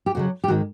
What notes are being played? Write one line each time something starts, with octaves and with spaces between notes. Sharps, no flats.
G4
F2 C#3 F#3 F#4
G4
G#2 D#3 G#3 F#4